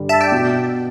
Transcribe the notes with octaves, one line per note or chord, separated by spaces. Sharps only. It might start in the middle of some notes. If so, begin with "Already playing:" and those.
Already playing: G2 D3 G3
E5 A5
D5 G5
B2